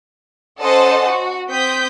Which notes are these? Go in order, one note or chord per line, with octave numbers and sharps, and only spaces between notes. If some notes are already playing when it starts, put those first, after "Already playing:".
C#4 A4 C5 D#5 F#5 A5
F#4
C4 D#6 G6 B6